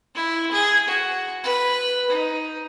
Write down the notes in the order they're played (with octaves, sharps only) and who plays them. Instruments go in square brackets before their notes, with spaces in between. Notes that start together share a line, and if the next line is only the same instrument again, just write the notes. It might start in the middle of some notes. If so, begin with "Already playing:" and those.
[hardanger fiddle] E4
G#4
F#4
B4
D#4